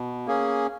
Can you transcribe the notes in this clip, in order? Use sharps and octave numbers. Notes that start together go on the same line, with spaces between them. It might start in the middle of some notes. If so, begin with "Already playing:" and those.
Already playing: B2
A#3 C#4 G#4